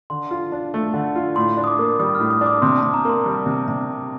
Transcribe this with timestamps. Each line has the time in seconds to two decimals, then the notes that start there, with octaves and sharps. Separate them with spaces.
0.10 D3 C6
0.31 F4
0.52 D4
0.74 A3
0.94 D3
1.15 F4
1.36 A2 C6
1.57 D4
1.64 D#6
1.67 D6
1.79 A#3
1.99 G3 D#6
2.15 A2 F6
2.30 D#6
2.41 D4
2.46 D6
2.62 C3 C6
2.78 C3 A5
2.94 A#5
3.05 A#3 C6
3.26 G3
3.46 C3
3.68 C3